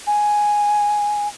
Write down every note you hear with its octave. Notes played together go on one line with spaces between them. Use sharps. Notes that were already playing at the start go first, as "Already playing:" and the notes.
G#5